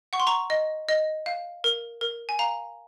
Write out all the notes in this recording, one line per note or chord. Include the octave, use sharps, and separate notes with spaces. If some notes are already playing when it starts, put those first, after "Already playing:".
F#5 C#6
C6
A#5 C#6
D#5
D#5
F5
A#4
A#4
G#5
F5 A#5